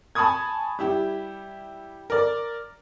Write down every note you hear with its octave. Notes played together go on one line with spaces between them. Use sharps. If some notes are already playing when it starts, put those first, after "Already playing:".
G#5 A5 B5 C#6 D#6 G#6
G3 E4 G4
A#4 D5